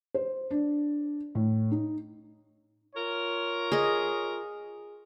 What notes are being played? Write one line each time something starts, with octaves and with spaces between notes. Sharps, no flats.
C5
D4
A2
D#4
F4 A#4 C#5
G#4 D#5